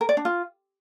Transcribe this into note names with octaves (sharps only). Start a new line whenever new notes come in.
A#4
D5
D4
F4